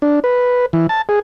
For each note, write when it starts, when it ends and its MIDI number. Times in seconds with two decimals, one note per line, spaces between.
0.02 0.20 62
0.24 0.66 71
0.73 0.87 52
0.89 1.02 81
1.09 1.19 68